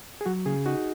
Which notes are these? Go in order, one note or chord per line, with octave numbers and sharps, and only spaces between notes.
G#4
F#3 F#4
C#3 G#4
D#4 F#4